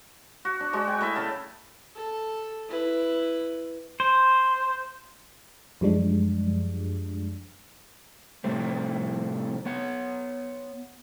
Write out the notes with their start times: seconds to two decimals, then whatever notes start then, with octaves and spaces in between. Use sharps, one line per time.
0.45 F#4
0.60 D4
0.73 G#3 D4 F#4
0.87 G5 G#5
1.01 A3 E4 D#5 E5
1.16 C#3 F5 A5
1.95 A4
2.69 E4 B4
4.00 C5
5.81 F#2 F3 G3 G#3 D4
8.44 F2 A2 C3 G3 A3 C4
9.66 B3 C#5 F#5